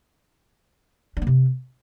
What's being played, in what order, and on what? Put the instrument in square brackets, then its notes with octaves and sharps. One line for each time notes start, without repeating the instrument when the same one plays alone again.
[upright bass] D4
A#3
C3